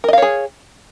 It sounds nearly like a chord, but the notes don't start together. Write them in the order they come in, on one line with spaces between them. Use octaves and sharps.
A#4 D#5 F5 C#5 G#4